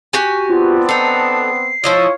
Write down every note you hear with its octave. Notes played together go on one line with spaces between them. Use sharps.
F#4 G4 G#5
B3 C4 D4 F4
D#4 A4 C7
F3 E4 F4 C#5 D#5